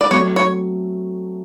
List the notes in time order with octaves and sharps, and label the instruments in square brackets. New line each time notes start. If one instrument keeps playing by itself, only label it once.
[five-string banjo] D5
[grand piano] F#3 A3 C4 [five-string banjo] C#5
[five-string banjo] C#5